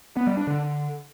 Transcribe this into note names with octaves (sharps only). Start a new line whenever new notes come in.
B3
G3
D4
D3